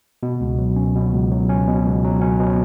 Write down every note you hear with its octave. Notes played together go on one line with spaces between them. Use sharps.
B2
C#2
F#3
C#4
B2
C#2
F#3
C#4
B2
C#2
F#3
C#4
B2